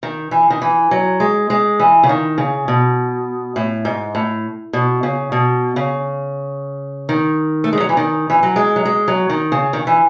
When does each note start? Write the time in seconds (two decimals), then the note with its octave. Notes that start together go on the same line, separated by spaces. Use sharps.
0.03 D#3
0.31 E3
0.50 D#3
0.62 E3
0.91 F#3
1.20 G#3
1.50 G#3
1.79 E3
2.03 C#3
2.09 D#3
2.38 C#3
2.68 B2
3.56 A2
3.85 G#2
4.15 A2
4.73 B2
5.03 C#3
5.32 B2
5.76 C#3
7.09 D#3
7.64 A3
7.73 G#3
7.80 F#3
7.89 E3
7.97 D#3
8.30 E3
8.43 F#3
8.56 G#3
8.76 F#3
8.85 G#3
9.08 F#3
9.30 D#3
9.52 C#3
9.73 D#3
9.87 E3